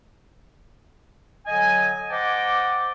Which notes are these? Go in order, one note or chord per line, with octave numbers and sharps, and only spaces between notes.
D3 F#3 D#5 G#5
C5 D#5 F#5 G5 A5 D6